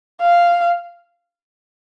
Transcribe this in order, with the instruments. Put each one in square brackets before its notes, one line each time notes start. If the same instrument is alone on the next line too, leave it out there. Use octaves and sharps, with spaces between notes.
[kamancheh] F5